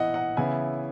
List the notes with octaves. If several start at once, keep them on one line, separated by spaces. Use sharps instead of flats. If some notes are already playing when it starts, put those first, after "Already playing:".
Already playing: E3 B3 D#5 F#5
D#5 F#5
C#3 E3 B3 E4 E5 G#5